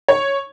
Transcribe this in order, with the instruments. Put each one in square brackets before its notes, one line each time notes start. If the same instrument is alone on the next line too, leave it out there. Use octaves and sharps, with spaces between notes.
[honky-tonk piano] C#5